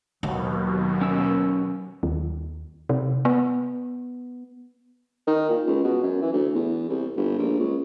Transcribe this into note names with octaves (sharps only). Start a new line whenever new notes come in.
D#2 B2 F#3
C#4 A#4 E6
D#2
C3
B3
D#3
A#2
C#2
B2
F#2
E3
D2
E2
C2
G1
A#1
C#2